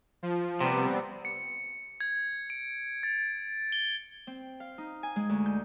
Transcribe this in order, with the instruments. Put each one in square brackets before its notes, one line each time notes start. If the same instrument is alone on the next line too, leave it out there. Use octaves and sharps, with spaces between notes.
[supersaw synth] F3
[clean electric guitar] C3 [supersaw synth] G3 B3 C4
[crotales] C#7
G#6
D7
A6
G7
[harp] C4
F5
D#4
G#5
G#3
D2
G6